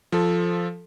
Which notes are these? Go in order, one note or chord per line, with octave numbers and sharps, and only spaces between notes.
F3 A4